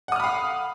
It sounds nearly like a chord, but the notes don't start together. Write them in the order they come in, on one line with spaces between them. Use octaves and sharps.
F#5 D#6 F6 B5 F5